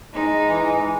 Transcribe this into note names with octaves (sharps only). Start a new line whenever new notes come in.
G#3 D#4
E3
E3